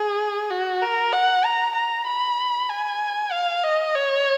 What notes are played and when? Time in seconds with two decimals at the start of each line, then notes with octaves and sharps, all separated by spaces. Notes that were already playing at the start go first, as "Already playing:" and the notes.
Already playing: G#4
0.50 F#4
0.82 A#4
1.13 F#5
1.45 A#5
1.76 A#5
2.07 B5
2.69 G#5
3.32 F5
3.64 D#5
3.95 C#5